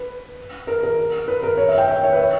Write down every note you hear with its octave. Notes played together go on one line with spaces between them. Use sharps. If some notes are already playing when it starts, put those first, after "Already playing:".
Already playing: B4
A#4
A#4
B4
A#4
C#5
E5
G5
E5
C#5
B4
C#5